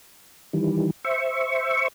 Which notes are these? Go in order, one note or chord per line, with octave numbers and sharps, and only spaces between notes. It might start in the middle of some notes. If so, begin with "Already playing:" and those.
D#3 E3 G3
C5 E5 C#6